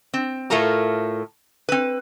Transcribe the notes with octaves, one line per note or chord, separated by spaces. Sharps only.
C4
A2 A3 F4 A4 A#4 A#5
C4 B4